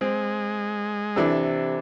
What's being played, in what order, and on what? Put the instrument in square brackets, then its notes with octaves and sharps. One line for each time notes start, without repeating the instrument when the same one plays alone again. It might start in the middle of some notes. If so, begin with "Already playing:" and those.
[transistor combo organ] G#3 [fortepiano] C4
[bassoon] C3 [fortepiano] E3 D4 A4